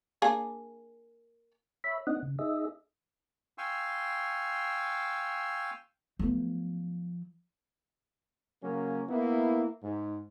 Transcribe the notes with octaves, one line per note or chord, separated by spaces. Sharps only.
A#3 D4 G#4
C#5 E5 B5
C4 D4 D#4 D#5 F#5
C#3
D#4 G#4 D#5 E5
F5 G5 G#5 C6 C#6 E6
F3 F#3 A3 B3
C#3 F#3 A#3 C#4
A#3 B3 E4
G#2